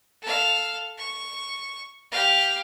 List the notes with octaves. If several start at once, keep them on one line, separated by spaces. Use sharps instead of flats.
A4 F5
C#6
G4 F5